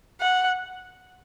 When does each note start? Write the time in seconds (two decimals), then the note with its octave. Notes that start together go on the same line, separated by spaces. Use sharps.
0.21 F#5